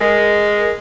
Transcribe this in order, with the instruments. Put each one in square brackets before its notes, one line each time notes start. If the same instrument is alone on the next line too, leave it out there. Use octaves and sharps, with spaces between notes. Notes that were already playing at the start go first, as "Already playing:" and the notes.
[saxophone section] G#3 A#4